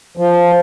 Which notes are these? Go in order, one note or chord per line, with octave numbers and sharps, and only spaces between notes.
F3